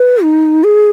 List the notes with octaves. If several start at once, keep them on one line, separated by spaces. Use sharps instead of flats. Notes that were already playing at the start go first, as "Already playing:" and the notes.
Already playing: B4
D#4
G#4